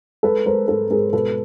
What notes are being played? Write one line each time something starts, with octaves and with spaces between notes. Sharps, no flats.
G#3 A4 B4
G#3 A#4 C5
G#2 A4 B4
G#2 G#4 A#4
B2 A4 B4